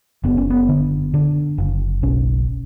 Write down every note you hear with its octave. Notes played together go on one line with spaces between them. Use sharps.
F#1 B3
C#4
B3
D3
D3
F#1
B1 C#4